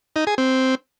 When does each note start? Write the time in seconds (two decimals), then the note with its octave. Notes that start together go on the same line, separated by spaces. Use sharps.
0.16 D#4
0.27 G#4
0.38 C4